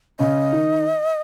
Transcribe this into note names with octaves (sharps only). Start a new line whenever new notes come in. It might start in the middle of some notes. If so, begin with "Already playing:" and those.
C#3 C#4 D#5
D#3 D#4